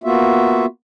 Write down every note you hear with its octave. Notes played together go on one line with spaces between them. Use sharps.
A#3 B3 F4 F#4 E5